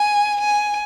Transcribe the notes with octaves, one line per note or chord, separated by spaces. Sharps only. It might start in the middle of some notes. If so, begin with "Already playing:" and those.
Already playing: G#5
G#5